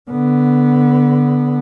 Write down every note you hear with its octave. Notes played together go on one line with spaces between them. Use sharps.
D3 B3